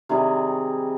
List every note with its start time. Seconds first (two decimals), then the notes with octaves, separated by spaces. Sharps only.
0.09 C3 D#3 G3 G#4